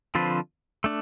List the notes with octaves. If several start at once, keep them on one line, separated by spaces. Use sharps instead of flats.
D3 F3 C4 F4 B4
A3 D4